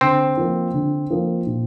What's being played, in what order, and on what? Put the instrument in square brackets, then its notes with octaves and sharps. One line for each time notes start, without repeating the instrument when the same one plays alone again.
[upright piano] D3 [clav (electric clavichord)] C4
[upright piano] F3 A#3
D3
F3 A#3
A#2